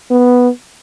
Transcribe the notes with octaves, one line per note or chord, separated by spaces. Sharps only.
B3